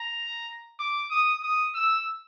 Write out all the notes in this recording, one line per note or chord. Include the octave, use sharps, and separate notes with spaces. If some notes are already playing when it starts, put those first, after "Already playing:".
Already playing: A#5
D6
D#6
D#6
E6